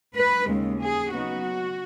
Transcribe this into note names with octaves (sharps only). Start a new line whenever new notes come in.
B4
D#2 C#3 G#3
G#4
C#3 F#3 B3 D#4 F#4